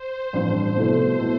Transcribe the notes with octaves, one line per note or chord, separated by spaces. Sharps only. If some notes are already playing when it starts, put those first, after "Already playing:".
Already playing: C5
A1 G2 F3 C4
C2 B2 A3 E4 A4
B2 A3 E4 A4